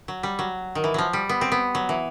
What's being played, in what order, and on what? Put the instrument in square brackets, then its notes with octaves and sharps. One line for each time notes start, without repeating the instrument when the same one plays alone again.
[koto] F#3
G3
F#3
D#3
E3
F3 F#3
G3
B3
C4
B3
F#3
E3